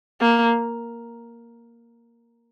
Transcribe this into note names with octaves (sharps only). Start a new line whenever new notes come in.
A#3